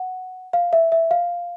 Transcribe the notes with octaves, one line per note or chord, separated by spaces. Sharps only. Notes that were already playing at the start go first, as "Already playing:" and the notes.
Already playing: F#5
F5
E5
E5
F5